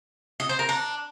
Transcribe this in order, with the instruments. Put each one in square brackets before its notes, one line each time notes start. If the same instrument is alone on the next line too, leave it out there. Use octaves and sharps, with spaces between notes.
[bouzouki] D#5
C5
A#4
D4